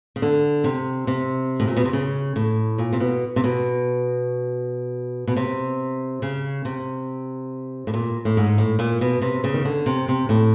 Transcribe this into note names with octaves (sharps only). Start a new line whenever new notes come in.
C#3
D3
C3
C3
A2
A#2
B2
C3
C#3
A2
A#2
C3
B2
C3
B2
B2
C3
C#3
C3
A2
A#2
A2
G#2
A2
A#2
B2
C3
C#3
D#3
D3
C3
C3
A2